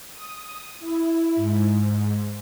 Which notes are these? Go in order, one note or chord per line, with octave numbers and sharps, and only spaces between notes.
D#6
E4
G#2